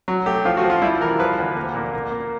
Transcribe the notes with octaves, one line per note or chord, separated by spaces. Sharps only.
F#3
A3 G4
F3 F4
F#4
F3
F4
G3 E4
E3 A#4
F3 B4
D2
A#3
A#2
A#3
A#3